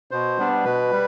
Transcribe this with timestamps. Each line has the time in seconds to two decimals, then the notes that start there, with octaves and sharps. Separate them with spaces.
0.11 B2 C5
0.38 G3 B3 D4
0.65 B2 B4
0.91 G3